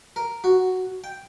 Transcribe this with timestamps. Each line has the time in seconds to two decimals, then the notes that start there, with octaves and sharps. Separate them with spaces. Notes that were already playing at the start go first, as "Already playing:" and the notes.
0.16 A#4
0.44 F#4
1.04 G5